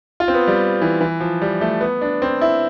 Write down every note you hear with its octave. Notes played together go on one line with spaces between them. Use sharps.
F4
C4
B3
G3
E3
E3
F3
G3
A3
B3
D4
C4
E4